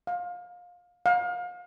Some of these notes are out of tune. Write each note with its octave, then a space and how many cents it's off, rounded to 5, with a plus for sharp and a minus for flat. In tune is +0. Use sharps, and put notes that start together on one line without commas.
F5 +25
F5 +35